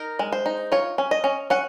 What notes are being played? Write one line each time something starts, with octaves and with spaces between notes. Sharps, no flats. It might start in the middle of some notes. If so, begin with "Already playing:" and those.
Already playing: D#4 A#4
G#3
C5
D#4
F4 C#5
C#4
D#5
C#4
C#4 F#5